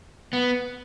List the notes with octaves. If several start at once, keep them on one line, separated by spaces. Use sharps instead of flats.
B3